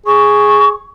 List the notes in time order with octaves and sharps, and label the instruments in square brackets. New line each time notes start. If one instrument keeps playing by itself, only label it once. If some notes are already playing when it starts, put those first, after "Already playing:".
[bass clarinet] G#4 [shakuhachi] C#6